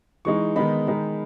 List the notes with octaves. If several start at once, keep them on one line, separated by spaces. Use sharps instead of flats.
E3 G#3 D#4 C#6
D#3 G#3 B3 D#4 B5
D#3 G#3 D#4